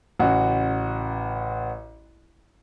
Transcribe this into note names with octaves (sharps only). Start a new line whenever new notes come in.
A1 C#3 F#4